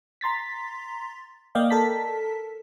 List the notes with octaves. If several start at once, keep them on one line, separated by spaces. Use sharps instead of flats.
A#5 C6 A6 B6
A#3 D5 D#5 F5 G5
A4 A#4 A5 B6